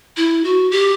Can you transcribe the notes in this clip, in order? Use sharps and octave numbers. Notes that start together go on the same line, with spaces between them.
E4
F#4
G4